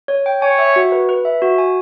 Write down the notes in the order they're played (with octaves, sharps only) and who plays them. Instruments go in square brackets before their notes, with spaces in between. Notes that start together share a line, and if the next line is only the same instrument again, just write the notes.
[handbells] C#5
G5
[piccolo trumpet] C#5 [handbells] G#5
[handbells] E5
F#4
B4
B4
E5
F#4
G#5